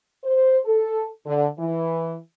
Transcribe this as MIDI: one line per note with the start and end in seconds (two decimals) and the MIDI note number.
0.24 0.59 72
0.65 1.06 69
1.26 1.47 50
1.58 2.16 52